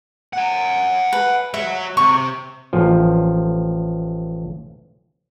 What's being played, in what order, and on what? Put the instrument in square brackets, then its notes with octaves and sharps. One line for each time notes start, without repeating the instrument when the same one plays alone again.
[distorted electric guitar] F#5 G#5
[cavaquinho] B4
[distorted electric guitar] F#4 C#5 [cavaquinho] E5
[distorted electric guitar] C3 [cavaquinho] C#6
[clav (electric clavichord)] A1 F3